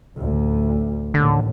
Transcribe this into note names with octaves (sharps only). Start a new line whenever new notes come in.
A1 D2
A1 D#2 A2 D3